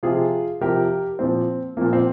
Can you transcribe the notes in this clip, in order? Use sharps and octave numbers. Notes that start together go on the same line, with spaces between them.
C3 F3 F4 G#4
C3 F3 G4 A#4
A#2 F3 C4
A#2 F3 A#3
C4